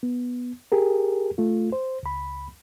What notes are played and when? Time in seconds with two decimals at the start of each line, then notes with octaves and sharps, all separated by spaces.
0.03 B3
0.72 G4 G#4 A#4
1.38 A3 F4
1.72 C5
2.03 C#2 B5